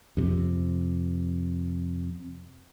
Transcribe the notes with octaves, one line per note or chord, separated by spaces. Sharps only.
F2 C3